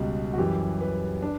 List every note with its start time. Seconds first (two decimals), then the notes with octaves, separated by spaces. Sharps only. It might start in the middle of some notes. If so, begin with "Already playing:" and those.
Already playing: C#2 B2 G3
0.33 F#4
0.38 F#2 E3 G3 G4
0.81 B4
1.22 D4